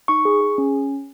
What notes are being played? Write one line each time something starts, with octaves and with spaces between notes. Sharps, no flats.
D#4 C#6
G#4
G#4
C#4